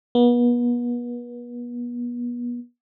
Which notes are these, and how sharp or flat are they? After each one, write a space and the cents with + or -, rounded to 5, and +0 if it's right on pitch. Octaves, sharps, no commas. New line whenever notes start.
B3 -35